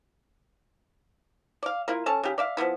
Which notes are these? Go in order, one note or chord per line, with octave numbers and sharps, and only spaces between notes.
D5 F5
A#3 E4 F4
C#4 A4 A5
C#3 G4
D5 E5 F5
F3 F#3 B3 E4